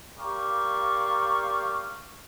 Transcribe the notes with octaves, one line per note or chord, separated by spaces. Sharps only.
A#3 G4 D5 F5 A#5 C#6